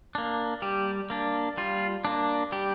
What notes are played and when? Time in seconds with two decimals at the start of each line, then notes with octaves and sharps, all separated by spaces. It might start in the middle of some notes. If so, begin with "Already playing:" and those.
0.15 A#3 D4
0.62 G3 G4
1.10 A#3 D4
1.58 G3 F4
2.05 A#3 D4
2.52 G3 G4